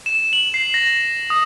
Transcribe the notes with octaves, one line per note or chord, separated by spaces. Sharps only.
E7
F#7
C7
A#6
D#6